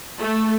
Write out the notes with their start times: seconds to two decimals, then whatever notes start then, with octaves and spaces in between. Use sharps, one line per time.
0.19 A3